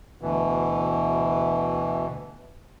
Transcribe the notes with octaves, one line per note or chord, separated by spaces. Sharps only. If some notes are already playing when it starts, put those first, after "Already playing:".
D2 B2 E3